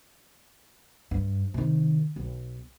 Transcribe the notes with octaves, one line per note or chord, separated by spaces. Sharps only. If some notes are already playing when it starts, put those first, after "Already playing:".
G2
C3 D#3
B1